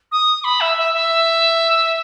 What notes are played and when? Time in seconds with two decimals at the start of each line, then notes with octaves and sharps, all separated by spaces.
0.11 D#6
0.44 B5
0.61 E5
0.77 E5
0.93 E5